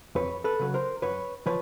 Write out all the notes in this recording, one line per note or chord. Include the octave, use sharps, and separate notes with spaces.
F2 B4 C#5
A4 B4
C#3 F#3
A#4 C5
F#2 B4 C#5
F3 B4 C#5